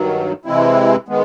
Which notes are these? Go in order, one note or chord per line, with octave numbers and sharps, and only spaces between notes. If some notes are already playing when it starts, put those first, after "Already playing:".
Already playing: G2 D#3 F#3
C3 E3 G#3 C4 E4
D#3 G#3 B3